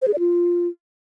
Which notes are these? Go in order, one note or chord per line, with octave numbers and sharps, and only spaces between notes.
C5
G#4
D5
F4